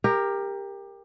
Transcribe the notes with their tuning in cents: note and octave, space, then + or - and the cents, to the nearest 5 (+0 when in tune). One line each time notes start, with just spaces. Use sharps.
G4 +20 A#4 +0